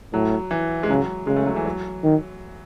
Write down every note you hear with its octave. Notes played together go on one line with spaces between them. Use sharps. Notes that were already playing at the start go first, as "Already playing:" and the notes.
A2 F#3
E3
G#3
C#3 F#3
C#3 G#3
A3
F#3
E3
F#3
D#3